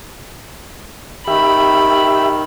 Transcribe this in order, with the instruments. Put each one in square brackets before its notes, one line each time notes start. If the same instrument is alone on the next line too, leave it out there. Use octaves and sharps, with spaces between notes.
[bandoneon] D#3 [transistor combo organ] G4 E5 [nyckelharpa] B5